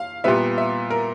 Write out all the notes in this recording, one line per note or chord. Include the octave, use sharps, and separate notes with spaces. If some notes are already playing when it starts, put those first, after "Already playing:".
Already playing: F5
A#2 G3 B3 E5
E5
A#4